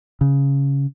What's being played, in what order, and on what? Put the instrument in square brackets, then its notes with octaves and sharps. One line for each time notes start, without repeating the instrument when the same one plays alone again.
[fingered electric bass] C#3